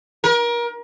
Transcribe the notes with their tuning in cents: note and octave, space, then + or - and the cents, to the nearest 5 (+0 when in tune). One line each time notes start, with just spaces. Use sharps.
A#4 +30